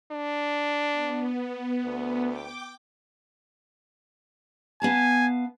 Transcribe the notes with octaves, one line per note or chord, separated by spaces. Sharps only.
D4
B3
D2
G5 D6
B3 F5 G#5 A5